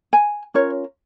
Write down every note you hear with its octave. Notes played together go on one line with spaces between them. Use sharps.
G#5
C#4 F4 A#4 C#5